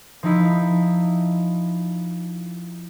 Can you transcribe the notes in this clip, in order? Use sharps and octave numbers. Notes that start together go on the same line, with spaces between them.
F3 D#4 E4